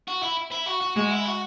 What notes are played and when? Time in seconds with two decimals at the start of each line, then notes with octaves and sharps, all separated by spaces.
0.08 F#4
0.23 E4
0.51 E4
0.66 F#4
0.81 F#4
0.96 G#3 F#4
1.11 E4
1.25 F#4